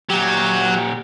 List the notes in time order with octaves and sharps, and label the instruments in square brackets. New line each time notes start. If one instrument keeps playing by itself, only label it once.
[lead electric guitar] A#2 G4 [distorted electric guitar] F#3